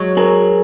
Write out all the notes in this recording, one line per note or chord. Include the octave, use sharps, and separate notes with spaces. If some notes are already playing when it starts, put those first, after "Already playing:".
Already playing: F#3 G#3
G#4 A#4